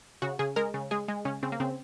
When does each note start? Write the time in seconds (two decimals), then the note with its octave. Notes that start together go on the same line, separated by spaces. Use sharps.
0.22 C#3 F#4
0.39 C#3 G#4
0.56 G#3 A#4
0.74 C#3
0.91 G#3 G#4
1.08 G#3
1.25 C#3 C#4
1.43 C#3 C4
1.52 A#3
1.60 C#3 C4